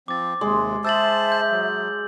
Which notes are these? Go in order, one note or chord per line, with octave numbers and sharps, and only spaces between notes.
F3 C4 D6 A6
D#2 C3 G#3 C6
C5 E5 A5 E6 A6 F#7
G6
F#3